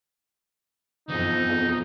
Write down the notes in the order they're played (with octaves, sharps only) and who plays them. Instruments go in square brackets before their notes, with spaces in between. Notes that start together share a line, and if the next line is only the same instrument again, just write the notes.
[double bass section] F2 [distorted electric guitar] B2 E3 [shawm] D#4